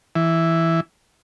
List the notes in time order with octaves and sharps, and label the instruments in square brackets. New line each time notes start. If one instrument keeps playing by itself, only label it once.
[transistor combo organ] E3